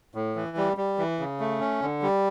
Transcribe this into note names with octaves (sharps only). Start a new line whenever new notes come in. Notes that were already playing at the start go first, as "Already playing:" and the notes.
A2
E3
G3
G3
E3
C#3
A3
C#4
D3
G3